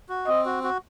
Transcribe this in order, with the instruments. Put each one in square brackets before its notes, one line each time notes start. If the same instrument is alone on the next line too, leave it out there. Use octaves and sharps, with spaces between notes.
[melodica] F#4
[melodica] C4 [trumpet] D#5
[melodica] F#4
F#4